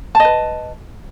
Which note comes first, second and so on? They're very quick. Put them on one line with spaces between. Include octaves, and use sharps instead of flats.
A5 D#5 B4